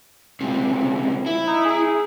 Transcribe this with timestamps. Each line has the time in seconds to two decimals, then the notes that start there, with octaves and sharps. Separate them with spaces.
0.40 C#2 C3
1.26 E4
1.47 D#4
1.65 G#4